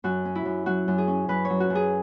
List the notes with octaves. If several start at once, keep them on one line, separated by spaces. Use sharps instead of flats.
F#2 F#4
C#4
E4
F#2
F#3 F#4
F#2
G#4
C#4
F#2 B4
F#3 C#5
F#4
F#2
G#4